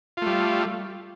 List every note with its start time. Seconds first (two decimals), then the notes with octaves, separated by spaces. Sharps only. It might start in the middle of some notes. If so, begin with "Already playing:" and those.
0.17 F4
0.22 A3
0.26 G3